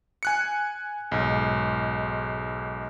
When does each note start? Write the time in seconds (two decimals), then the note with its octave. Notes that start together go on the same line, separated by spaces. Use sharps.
0.23 G#5 F#6 C#7
1.12 B1 G#2